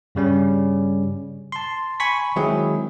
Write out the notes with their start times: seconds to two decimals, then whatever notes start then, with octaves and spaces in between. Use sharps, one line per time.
0.15 G2 C#3 G3 C#4
1.52 A5 C6
2.00 G#5 B5 C#6 B6
2.36 D#3 F#3 G#3 C4 E4 G#4